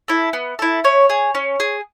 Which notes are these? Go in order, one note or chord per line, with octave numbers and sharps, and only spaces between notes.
E4 A4
B3
E4 A4
C#4 C#5
G#4
C#4
G#4